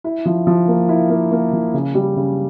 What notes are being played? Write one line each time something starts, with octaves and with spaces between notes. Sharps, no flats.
E4
F3
F3
A#3
E4
A#3
A#3
F3
C#3
G3
C#3